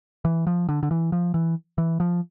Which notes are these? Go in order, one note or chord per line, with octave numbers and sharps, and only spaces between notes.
E3
F3
D3
D3
E3
F3
E3
E3
F3